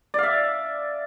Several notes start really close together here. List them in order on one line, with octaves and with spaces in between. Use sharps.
D5 F5 E5